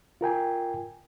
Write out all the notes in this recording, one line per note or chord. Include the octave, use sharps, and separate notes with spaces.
F4 A#4 G5 G#5